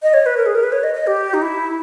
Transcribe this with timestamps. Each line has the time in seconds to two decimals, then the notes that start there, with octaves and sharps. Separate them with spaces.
0.03 D#5
0.14 C#5
0.26 B4
0.37 A#4
0.46 G#4
0.55 A#4
0.63 B4
0.72 C#5
0.83 D#5
0.94 D#5
1.07 G4
1.34 D#4
1.42 E4